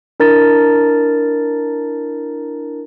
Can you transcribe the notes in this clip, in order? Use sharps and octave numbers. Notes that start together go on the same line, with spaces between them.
D4 E4 A#4 A#5 A6